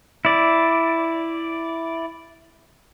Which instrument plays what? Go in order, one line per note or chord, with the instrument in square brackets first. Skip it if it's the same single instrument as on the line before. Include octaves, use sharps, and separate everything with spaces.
[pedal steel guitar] E4 D5